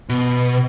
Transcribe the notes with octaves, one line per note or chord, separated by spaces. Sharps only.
B2